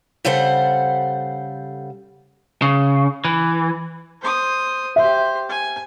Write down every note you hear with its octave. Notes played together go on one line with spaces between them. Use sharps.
C#3 G3 A4 C5 F#5
C#3
E3
C5 D#6
G4 C5 E5
G#5